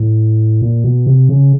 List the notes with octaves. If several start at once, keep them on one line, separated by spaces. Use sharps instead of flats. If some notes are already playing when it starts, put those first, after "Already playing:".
Already playing: A2
A#2
B2
C3
C#3